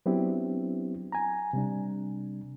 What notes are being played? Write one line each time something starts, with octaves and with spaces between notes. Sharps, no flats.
F#3 B3 C4 D4 E4 G4
G#5 A#5
C3 G3 D4